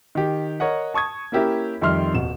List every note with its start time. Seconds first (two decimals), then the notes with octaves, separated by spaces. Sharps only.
0.15 D#3 G4
0.60 A#4 C#5 D#5 F#5
0.94 A5 C#6 D#6 G#6
1.32 A#3 C#4 E4 G4 A#4 E5
1.82 F2 D#3 G3 E5 C6 F6
2.14 D#1 B2 E7